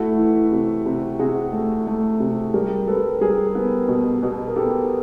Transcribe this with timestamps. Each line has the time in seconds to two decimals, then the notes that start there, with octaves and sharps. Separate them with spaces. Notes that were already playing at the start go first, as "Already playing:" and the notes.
Already playing: A3 E4 F#4
0.18 E3
0.52 C3
0.86 C3
1.19 C3 F#4 G#4
1.53 A3
1.87 A3
2.20 C3
2.54 G3 G#4 A#4
2.87 G3 A4 B4
3.21 G3 G#4 A#4
3.55 B3
3.88 B2
4.23 B2
4.48 A#4
4.56 B3 G4 A4